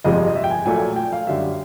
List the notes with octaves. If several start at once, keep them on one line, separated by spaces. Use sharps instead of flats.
G1 F2 C3 F3 G#3 D#5
E5
G5
G#5
A#1 A#2 F#3 A3 G#5
G5
F5
F#2 D3 G3 E5